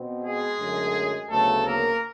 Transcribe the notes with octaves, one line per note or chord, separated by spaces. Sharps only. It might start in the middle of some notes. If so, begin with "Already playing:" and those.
Already playing: B2 C4
G#3 G#4
F#2 D3 F#3 A3
D2 C#3 F#3 A3 B3 A4
A#3 A#4